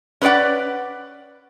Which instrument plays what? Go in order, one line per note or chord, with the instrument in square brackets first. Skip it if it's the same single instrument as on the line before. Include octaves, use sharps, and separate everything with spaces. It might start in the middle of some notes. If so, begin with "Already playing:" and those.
[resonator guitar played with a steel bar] C#4 B4 C5 D5 F#5